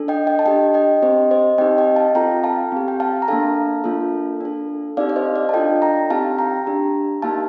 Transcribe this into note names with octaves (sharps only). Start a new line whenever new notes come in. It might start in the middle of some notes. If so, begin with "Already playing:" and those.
Already playing: D4 A4
D#5 G5
D#5 G5
A5
D4 G4 D#5 G5
D#5 G5
C4 G4 C5 D#5
C5 D#5
C4 D#4 G4 D#5 G5
D#5 G5
F5 A5
C4 F4 A4 G5 A#5
F5 A5
C4 G4
G5
F5 A5
A#5
A#3 D4 A4 F5 A5
A#3 D4 F4 A4
D4 A4
C4 D#4 G4 D5 F5
D5
C5 D#5
D5 F5
A5
D4 F4 A4 D#5 G5
G5 A#5
C4 D#4 G4 F5 A5
G5 A#5
D4 G4
A#3 D#4 G4 F5 A5